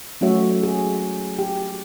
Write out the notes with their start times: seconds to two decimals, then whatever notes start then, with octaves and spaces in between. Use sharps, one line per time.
0.21 F#3 A3 C#4 F#4 C#5 E5
0.63 G#4
1.39 G4